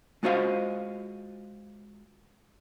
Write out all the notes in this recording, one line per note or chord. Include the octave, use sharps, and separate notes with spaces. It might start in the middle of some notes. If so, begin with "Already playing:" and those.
G#3 F4 F#4 C5 D#5 F5